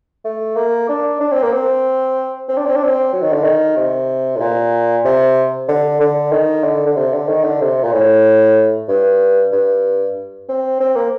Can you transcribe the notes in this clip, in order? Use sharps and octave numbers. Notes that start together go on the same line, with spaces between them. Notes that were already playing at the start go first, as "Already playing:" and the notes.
A3
A#3
D4
D4
C4
A#3
C4
C4
D4
C4
D4
C4
F#3
D#3
D3
D#3
C3
A2
A#2
C3
D3
D3
D#3
D3
D3
C3
D3
D#3
D3
C3
A#2
A2
G2
G2
C4
C4
A#3